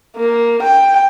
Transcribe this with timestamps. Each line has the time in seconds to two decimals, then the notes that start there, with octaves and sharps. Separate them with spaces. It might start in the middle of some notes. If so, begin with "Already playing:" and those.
0.16 A#3
0.63 G5